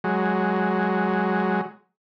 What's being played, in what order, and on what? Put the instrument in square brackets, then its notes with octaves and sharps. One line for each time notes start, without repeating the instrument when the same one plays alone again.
[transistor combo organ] F#3 G#3